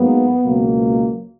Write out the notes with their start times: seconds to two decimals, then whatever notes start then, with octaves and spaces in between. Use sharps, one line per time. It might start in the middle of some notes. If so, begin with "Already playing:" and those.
Already playing: G#2 F#3 A#3 B3
0.43 C#2 B2 F#3 A#3